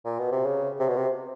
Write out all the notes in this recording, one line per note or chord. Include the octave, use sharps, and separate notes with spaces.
A#2
B2
C3
C#3
C3
B2
C3